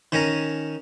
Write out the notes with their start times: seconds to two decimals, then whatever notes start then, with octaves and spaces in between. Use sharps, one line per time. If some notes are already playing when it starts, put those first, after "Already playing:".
0.12 D#3 C#4 G#5 A#5